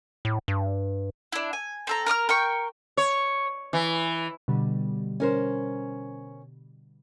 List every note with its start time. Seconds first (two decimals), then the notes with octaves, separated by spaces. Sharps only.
0.25 A2
0.48 G2
1.32 D4 E4
1.53 G#5
1.87 C4 A4 A#5
2.06 A#4 A#5 D6 F6
2.29 A#4 G5 C#6
2.97 C#5
3.73 E3
4.48 B2 D3 G3
5.20 C#4 A#4 C5